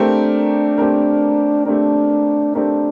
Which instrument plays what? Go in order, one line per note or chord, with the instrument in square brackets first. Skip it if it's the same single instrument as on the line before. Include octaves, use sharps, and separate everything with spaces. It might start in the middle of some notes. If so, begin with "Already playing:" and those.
Already playing: [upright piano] A3 C4 G4 A#4 [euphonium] D4
[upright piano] A3 C4 G4 A#4
[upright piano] A3 C4 G4 A#4 [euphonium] D4
[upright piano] A3 C4 G4 A#4 [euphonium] D4